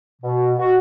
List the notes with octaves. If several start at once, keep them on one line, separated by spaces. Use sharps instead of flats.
B2
F#4